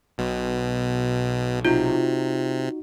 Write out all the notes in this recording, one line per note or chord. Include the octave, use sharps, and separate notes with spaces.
B1 B2
C3 D#4 F4 F#4